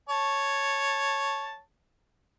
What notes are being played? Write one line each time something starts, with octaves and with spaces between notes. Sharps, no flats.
C#5 A5